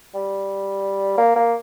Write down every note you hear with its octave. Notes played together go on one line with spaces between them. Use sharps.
G3
A#3
A#3